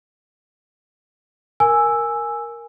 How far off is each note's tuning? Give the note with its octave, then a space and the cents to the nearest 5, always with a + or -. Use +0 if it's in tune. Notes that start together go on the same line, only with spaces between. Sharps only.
A#4 +0 G#5 +0 E6 +0